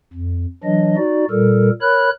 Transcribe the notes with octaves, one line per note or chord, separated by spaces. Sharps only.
F2
E3 F#3 D4 D#5
D#4 F#4 D5
A#2 G3 A4 A#4
A#4 C#5 B5 F#6